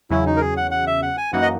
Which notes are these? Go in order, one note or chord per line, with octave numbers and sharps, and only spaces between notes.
E2 C#3 F#3 C#4 E4
D#4
A#4
G#4
F#5
F#5
E5
F#5
G#5
F#2 E3 A#3 D#4 F#4 F#5
D#5